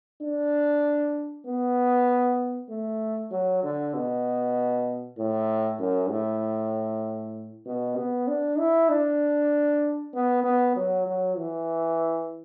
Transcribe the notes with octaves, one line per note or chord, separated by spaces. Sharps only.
D4
B3
A3
F#3
D3
B2
A2
F#2
A2
B2
B3
D4
E4
D4
B3
B3
F#3
F#3
E3